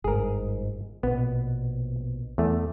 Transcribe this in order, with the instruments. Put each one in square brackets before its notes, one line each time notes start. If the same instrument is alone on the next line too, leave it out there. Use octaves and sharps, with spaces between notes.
[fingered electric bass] G1 G#2 [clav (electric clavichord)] G#4 A#4
[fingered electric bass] A#1 B2 [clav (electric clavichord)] B3
[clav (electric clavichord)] E2 A3